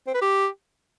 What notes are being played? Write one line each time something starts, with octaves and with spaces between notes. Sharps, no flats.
C4
B4
G4